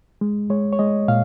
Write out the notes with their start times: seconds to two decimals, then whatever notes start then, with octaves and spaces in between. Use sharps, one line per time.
0.21 G#3
0.50 G#3 C#5
0.73 C#5
0.79 G#3 D#5
1.08 A#2 F5